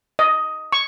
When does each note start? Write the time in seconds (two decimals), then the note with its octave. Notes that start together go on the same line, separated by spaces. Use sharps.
0.19 D#5
0.72 C#6